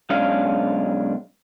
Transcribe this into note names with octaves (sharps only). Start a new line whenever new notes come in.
B1 G#3 C#4 D4 D#5 F5